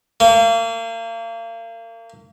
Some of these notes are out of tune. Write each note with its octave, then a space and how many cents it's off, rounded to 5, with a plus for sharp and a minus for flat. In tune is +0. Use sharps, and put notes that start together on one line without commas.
A#3 -35